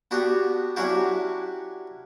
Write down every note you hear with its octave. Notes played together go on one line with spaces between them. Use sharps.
B3 D4 F#4 G4
F#3 C#4 D4 E4 F#4 G4